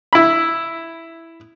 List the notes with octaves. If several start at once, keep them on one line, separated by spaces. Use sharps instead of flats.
E4 B5